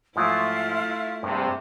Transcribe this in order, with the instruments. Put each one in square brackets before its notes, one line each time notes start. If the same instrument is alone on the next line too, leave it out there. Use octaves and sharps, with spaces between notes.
[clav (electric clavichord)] G#2 F3 F#3 [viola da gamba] A3 E4 [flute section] F4 E5 F5
[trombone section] A#1 C3 [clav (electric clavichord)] G2